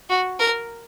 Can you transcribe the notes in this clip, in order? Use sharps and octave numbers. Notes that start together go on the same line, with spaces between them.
F#4
A#4